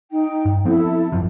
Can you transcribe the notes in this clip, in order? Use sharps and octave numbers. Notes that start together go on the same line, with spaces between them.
D#4 G5
G2
F3 B3 C4 E4 A4
G#1 F#2 F3